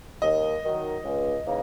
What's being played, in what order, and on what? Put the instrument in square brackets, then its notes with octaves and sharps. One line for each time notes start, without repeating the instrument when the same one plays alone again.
[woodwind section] D#2 [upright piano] D#5
[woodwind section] D#3 F#3
C#2
C#3 E3 A#3 D#4